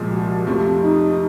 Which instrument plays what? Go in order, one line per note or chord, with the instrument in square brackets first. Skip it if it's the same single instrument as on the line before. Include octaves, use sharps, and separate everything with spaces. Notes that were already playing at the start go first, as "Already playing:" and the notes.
Already playing: [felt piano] C2 A#2 F3 G#3
[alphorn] F#4
[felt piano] F2 C3 F3 A3 [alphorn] F4
[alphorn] D#4